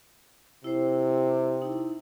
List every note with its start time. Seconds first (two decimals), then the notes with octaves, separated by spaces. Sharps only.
0.64 C3 E4 C5
1.62 D#4 E4